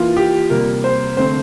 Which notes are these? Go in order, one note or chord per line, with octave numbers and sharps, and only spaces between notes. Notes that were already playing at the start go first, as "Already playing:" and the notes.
Already playing: E3 A#3 F4
G4
C3 G3 A#3 A#4
C5
D3 A3 C4 C5